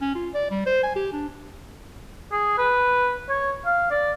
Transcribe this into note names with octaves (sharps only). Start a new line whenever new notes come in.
C#4
F4
D5
G3
C5
G#5
G4
D4
G#4
B4
C#5
F5
D5